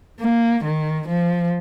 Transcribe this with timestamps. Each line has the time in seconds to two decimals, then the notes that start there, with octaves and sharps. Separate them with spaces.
0.20 A#3
0.64 D#3
1.08 F3